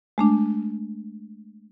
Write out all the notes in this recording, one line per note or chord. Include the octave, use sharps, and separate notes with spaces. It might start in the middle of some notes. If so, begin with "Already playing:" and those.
G#3 A3 D4